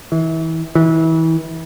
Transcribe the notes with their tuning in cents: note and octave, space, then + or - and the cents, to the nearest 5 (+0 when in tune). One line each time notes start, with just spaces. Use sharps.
E3 -30
E3 -30